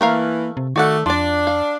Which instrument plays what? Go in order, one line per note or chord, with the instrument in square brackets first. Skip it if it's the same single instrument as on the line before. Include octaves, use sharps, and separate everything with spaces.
[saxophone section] E3 [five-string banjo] A3 A#4 F5 [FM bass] A#3
[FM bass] C3
[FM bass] D#3 [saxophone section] A3 [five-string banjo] F#4 D5 F#5
[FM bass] F2 [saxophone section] D4 [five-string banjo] F4 D5
[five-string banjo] F5